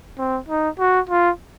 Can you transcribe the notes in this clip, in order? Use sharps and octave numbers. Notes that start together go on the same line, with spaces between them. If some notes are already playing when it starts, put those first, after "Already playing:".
C4
D#4
F#4
F4